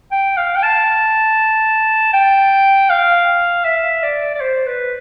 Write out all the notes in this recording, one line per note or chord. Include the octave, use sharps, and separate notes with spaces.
G5
F5
G5
A5
G5
F5
E5
D5
D5
C5
B4